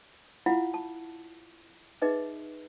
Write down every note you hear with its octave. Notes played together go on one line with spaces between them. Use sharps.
E4 F4 F5 F#5 B5
A5
D#4 G#4 B4 D#5 E5